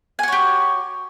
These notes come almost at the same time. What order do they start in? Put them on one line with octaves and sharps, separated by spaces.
G#5 F#4 C#5 G4